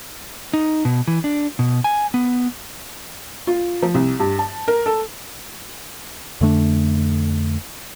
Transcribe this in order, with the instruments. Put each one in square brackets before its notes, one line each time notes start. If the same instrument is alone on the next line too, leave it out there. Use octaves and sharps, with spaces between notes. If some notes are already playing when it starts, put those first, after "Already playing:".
[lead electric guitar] D#4
B2
E3
D4
B2
G#5
B3
[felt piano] F4
F3
C2
G2
A5
A#4
A4
[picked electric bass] F2 D3 A3 D4